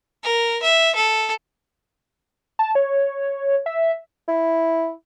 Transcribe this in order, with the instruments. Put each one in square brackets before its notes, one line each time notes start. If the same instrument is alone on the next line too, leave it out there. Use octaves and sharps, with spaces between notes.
[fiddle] A#4
E5
A4
[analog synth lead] A5
C#5
E5
[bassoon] E4